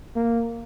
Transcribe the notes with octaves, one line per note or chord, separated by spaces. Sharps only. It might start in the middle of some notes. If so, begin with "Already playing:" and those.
A#3